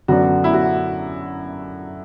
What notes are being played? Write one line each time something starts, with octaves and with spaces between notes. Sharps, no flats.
F#2 D3 F#3 B3 D4 F#4
E4
F#4